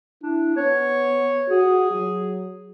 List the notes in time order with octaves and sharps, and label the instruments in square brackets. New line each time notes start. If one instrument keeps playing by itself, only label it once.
[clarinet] D4 [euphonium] E4
[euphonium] B3 [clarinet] C#5
[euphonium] F#4 [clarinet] G#4
[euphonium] F#3